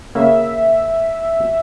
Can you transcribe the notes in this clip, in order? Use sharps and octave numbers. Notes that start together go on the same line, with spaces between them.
C#3 A#3 E5